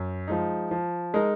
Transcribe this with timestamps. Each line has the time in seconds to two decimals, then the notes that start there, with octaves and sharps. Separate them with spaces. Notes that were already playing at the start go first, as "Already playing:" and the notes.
Already playing: F#2
0.28 F3 G#3 D#4
0.71 F3
1.14 G#3 D#4 A#4